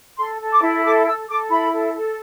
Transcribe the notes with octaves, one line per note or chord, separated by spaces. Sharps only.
A4 C6
A4
D6
E4
A4 D6
A4 E6
A4 D6
E4 B5
A4
A4